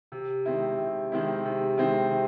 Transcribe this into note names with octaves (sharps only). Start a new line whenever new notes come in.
C3
D#3 G#3 C4 E4
C3
D#3 G#3 C4 E4
C3
D#3 G#3 C4 E4
C3